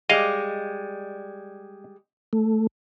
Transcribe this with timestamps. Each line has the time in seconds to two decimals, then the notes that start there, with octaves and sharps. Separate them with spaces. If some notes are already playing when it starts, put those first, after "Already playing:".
0.09 G3 G#3 D#5 F5
2.33 A3